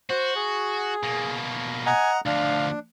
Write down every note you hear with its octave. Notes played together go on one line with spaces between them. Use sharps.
F#4 C5
G#4
B2 A#3
D#5 F#5 G#5 A#5
D2 F3 D4 F5